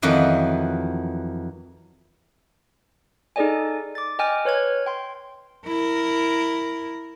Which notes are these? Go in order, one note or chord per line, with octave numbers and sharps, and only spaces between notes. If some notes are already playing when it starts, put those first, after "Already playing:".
F2 D#3 E3 F#3
D#4 G#4 A4 D5 D#5 G#5
D6 A6
D#5 G5 G#5 F6
B4 C#5 F6 G#6
G5 C6
E4 A#4